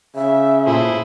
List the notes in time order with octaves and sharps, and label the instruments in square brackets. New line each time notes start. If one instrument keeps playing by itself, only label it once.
[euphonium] C#3 [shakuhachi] E5
[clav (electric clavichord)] A#2 F4 A4 [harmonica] E4 G#4 C5